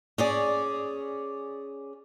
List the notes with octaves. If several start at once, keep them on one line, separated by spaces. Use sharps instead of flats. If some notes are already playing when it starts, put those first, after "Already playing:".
C#4 G#4 D5